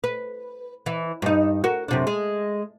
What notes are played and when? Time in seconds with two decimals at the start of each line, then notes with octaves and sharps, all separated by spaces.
0.04 B4
0.86 E3
1.22 G2 D#4
1.64 F#4 A#4
1.88 F#2 C3 D4
2.07 G#3